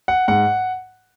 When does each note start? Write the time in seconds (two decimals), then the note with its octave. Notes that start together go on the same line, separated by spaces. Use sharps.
0.08 F#5
0.28 G#2 F#5